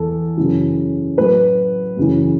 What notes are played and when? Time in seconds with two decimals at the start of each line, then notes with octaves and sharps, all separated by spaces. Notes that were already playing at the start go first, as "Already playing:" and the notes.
Already playing: E2 E3 A4
0.37 F#2 C#3 E3
1.17 A2 F#3 B4
1.97 F#2 C#3 E3